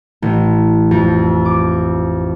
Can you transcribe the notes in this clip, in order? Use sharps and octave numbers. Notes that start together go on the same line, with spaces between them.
A1
F2
D6